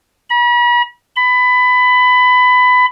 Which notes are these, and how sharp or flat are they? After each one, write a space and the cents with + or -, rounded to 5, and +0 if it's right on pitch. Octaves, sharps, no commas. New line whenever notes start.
B5 -40
B5 +20